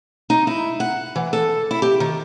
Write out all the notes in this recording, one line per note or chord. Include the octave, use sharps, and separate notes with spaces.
D#4
E4
F#5
E3
A4
E4
G4
D#3